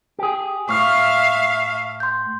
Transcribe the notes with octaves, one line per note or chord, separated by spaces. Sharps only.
G4 G#4
A2 E5 F5 C#6 F6
C6 G6